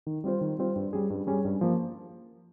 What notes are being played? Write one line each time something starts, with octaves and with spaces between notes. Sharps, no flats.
D#3
G3 C4 F4 C5
D#3
G3 C4 F4 C5
G2
G3 C#4 G#4
G2
G3 C#4 G#4
G2
F3 A#3